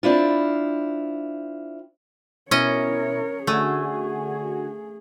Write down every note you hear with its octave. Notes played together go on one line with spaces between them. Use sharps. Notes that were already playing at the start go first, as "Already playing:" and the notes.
C4 D4 E4 F4
B2 C#4 E4 A#4 C#5 D#5
D3 A3 F#4 G#4 G#5